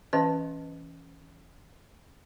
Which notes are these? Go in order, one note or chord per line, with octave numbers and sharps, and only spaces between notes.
E3 C#4 B4 D#5 A5